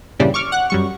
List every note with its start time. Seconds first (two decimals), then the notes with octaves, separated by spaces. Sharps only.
0.19 G2 A#2 C#3 E3 G3
0.34 C#6 D6 F6
0.52 F#5 F#6
0.70 F#2 G3 C#6